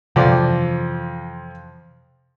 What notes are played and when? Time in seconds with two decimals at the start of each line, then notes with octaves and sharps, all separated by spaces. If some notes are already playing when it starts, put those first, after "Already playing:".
0.16 F2 C3 E3 F3 D5